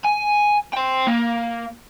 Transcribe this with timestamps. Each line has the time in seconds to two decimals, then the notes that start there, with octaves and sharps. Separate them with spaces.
0.05 G#5
0.73 C5 G5
1.07 A#3